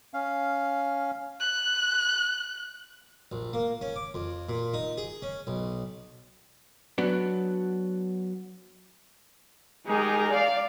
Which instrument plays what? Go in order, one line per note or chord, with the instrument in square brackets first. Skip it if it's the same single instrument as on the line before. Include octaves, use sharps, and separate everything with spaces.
[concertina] C#4 F5
[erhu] F#6
[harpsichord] A#1
A#3
C#4
D6
F2
A#2
D#4
G#4
C#4
B1
[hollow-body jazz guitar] F#3 B3 D4
[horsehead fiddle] G#3 G#4 [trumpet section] D#4 G4 A#4
[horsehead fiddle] D5 [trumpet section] F5